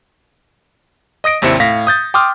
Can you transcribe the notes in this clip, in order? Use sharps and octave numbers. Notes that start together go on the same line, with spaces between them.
D#5 D#6 A#6 D7
G#1 D#2 C3 C4 E4 C#7
A2 F5 A#6 B6
D#6 G6 A6
G5 C6 D6 D#6 F6